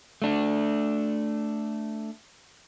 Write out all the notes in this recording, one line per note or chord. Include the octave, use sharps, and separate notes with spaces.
A3 D4